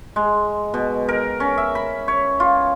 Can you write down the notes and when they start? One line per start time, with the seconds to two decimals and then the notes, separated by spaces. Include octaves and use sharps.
0.16 G#3
0.74 B2
1.09 A#4
1.40 C#4
1.58 E5
1.75 B5
2.08 C#5
2.40 F4